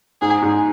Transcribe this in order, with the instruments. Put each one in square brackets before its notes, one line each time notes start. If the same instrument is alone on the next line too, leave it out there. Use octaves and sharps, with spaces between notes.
[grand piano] G#2 [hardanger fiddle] G#4
[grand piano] G#2